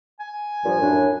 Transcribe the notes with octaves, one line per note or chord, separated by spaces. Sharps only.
G#5
G2 A#2 F3
F#2 A2 D4